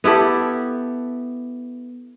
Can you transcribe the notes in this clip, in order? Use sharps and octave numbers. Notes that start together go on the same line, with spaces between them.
B3 E4 G4 A4